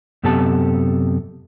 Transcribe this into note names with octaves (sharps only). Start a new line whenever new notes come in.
F#2 C3 B3 G4 A4 A5